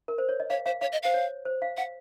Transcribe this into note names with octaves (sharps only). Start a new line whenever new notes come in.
A#4
C5
C#5
D#5
C#5 F5
C5 F5
C#5 F5
D#5
C5 F5
C#5
C5
F5
F5 F#5